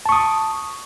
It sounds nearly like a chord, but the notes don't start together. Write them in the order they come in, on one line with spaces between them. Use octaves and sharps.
A5 C#6 D#6